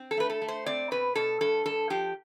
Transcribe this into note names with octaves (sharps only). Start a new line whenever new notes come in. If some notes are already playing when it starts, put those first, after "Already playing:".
Already playing: C4
A4
A3 B4
A4
A3
C5
C4 D5
B2 B4
B2 A4
G2 A4
G2 A4
F3 G4